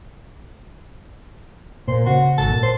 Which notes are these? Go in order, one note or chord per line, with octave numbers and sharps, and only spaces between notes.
A#2 C5
C#3 F#4
G#1 A5
A#2
C5